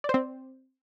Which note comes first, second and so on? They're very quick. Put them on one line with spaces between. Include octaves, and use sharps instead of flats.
D5 C5 C4